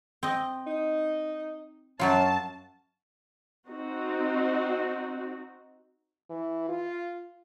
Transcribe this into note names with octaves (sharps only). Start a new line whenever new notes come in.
C4 D#5
D#4
F#2 F#3 F4 C#5 A5
C4 D#4 F#4
E3
F4